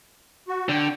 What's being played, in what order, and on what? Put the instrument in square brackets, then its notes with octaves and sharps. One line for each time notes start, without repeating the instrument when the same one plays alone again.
[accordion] F#4
[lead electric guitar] D3 [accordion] G5